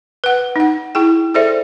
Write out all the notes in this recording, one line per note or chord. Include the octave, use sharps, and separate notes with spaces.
B4 F#5
D#4 F#5
E4 G#4 G5
G#4 A4 C5 D5 E5